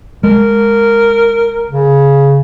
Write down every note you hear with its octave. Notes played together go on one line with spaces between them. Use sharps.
G#3 A#4
C#3